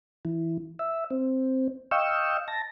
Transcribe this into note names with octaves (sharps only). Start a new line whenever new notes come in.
E3
E5
C4
D#5 F5 G5 C#6 E6
A5 A#6